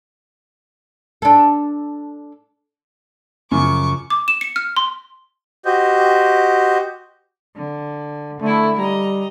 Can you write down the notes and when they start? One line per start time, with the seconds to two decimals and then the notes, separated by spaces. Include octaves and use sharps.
1.22 D4 A4
3.51 F#2 C#3 F3 C#6 D6
4.10 D6
4.28 E7
4.41 C#7
4.56 F6
4.76 C6
5.65 F#4 G4 C5 D#5
7.56 D3
8.41 D3 A3 E4
8.78 G3 D#5 A#5